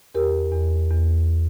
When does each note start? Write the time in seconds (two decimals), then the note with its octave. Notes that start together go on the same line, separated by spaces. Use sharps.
0.15 E2 G4 A#4
0.53 E2
0.91 E2